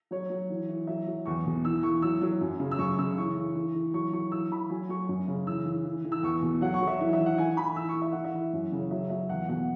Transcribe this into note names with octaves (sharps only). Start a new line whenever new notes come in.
F#3 C#5
F#3
E3
E3
F#3 E5
F#3
E2 C#6
B2
E3 E6
E3 C#6
F#3 E6
F#3
F#2
C#3
E6
F#2 C#6
C#3 E6
E3 C#6
E3
E3
E3
F#3 C#6
F#3 C#6
E3 E6
E3 B5
F#3 G#5
F#3 C#6
F#2
C#3
E3 E6
E3
E3
E3
E6
E2 C#6
B2
F#3 F#5
C#6
F#3
E5
E3 E5
E5
E3
F#5
E3 G#5
E3 B5
E3 E6
C#6
E3
E5
E3 F#5
E5
E3
F#2
C#3
C#5
F#3 E5
F#3 E5
E2 F#5
B2 F#5